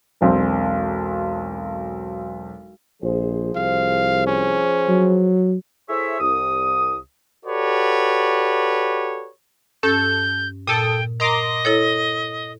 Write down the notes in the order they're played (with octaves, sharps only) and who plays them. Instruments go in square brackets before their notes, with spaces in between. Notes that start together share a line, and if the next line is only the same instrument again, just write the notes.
[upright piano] E1 B1 C4
[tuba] A#1 [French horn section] F3 G#4 C5
[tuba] C2 [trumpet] F5
[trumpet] C#4
[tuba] F#3
[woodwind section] E4 G#4 A4 C5 C#5 E5
C2 D#6
[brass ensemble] F#4 G4 A4 B4 C#5 D5
[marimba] G2 C#4 [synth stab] A4 [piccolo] G6
[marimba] A#2 [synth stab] A4 D#6 [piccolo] G5
[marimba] A#4 [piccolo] D#5 [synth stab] A#5 C6 D6
[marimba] E4 A4 C#5